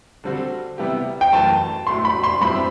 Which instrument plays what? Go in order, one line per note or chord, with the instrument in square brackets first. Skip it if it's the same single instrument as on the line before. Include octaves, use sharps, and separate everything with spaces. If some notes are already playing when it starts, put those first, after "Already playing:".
[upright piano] D3 G3 C4 F#4
C3 G3 B3 E4 G4
[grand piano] G5
[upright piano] F#2 E3 A3 [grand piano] A5
[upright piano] A2 F#3 A3 [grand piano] C6
[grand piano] B5
C6
[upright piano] G2 F#3 C4 E4 G4 [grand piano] B5